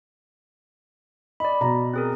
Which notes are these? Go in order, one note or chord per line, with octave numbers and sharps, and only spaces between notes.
D5 D#5 B5
B2 A#5
C4 G#4 A#4